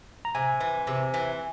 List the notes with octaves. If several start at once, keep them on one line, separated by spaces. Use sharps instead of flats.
A#5
C3 G#5
E3
C3
E3